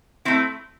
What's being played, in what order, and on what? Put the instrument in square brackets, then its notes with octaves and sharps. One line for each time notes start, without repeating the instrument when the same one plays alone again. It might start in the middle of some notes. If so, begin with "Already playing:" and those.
[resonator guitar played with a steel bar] A3 C4 E4